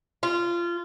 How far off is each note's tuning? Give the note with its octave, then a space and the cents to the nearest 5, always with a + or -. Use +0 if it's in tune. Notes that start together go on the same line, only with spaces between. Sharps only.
F4 -20